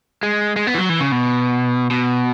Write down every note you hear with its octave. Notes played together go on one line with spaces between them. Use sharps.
G#3
G#3
B3
E3
F#3
E3
C#3
B2
B2